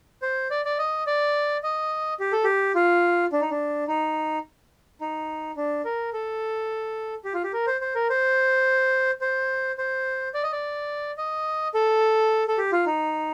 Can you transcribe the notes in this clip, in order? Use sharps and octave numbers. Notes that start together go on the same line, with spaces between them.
C5
D5
D5
D#5
D5
D#5
G4
A4
G4
F4
D4
D#4
D4
D#4
D#4
D4
A#4
A4
G4
F4
G4
A#4
C5
C5
A#4
C5
C5
C5
D5
D#5
D5
D#5
A4
A4
G4
F4
D#4